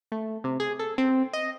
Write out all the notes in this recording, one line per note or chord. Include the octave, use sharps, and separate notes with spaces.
A3
C3
G#4
A4
C4
D#5